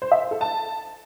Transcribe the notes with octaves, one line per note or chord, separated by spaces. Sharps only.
C5
E5
C5
A4
A5